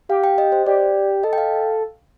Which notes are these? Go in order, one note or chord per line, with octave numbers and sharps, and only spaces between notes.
G4 F5
G5
D#5
C5
G4 D5
A4 D#5
G5
F5